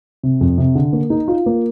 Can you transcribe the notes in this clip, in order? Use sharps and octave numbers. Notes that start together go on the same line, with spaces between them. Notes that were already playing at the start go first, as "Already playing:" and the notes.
C3
F2
C3
D3
A#3
D#4
F4
A#3